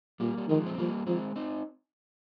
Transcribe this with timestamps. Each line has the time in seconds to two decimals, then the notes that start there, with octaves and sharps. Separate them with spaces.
0.20 A#2 G3 A#3
0.38 G3
0.48 D#3 F3 G#3
0.66 C4
0.78 F3 G3 A#3
1.07 F3 G#3 C4
1.36 C4 D#4